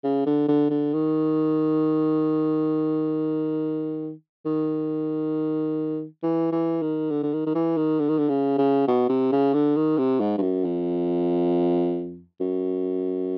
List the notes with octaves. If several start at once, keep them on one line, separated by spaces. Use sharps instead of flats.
C#3
D3
D3
D3
D#3
D#3
E3
E3
D#3
D3
D3
D#3
D#3
E3
D#3
D3
D#3
D3
C#3
C#3
B2
C3
C#3
D3
D#3
C3
G#2
G2
F#2
F2
F#2